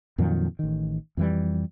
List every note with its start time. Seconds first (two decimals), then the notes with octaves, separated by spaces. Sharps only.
0.18 F2 A#2 D#3 F#3
0.59 A1 D#3
1.17 F2 E3 G3